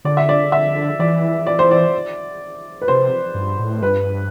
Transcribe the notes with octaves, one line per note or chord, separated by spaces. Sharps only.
D3 D5
E5
D5
E5
E3 D5
D5
C5
D5
B4
C3 C5
G2
A2
G2 B4